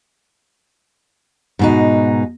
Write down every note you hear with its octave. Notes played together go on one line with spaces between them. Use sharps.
G#2 B2 D#4